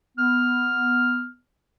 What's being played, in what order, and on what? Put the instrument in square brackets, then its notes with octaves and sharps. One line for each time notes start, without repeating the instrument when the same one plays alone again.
[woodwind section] B3 F6